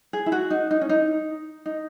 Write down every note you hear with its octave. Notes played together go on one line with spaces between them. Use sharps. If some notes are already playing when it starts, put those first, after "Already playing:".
G#4
E4
F#4
D#4
D#4
C#4
D#4
D#4